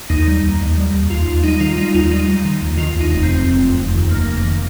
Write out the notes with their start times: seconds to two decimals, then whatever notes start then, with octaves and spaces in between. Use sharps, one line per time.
0.10 D#2 D#4
0.28 G3
0.43 D#2
0.60 D#2
0.78 G3
0.93 D#2
1.10 D#2 F4
1.28 D#2
1.43 G3 D#4
1.60 D#3 F4
1.77 G3 D#4
1.94 D#2 F4
2.10 G3 D#4
2.28 G3
2.45 D#3
2.62 D#2
2.77 D#3 F4
2.95 D#2
3.01 D#4
3.11 F1
3.23 C4
3.28 F1
3.45 F1
3.61 F1
3.77 F1
3.94 D#2
4.11 F1 A#3
4.29 F1
4.45 D#3